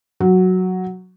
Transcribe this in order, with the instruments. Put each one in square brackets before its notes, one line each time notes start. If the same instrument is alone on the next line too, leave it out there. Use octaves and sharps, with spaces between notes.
[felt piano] F#3